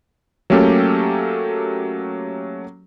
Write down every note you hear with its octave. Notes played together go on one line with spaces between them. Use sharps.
F#3 A3 A#3 C#4 G4 A4